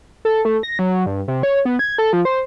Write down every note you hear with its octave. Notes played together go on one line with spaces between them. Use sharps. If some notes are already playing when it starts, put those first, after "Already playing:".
A4
A3
A#6
F#3
G2
C3
C#5
B3
G#6
A4
F3
C5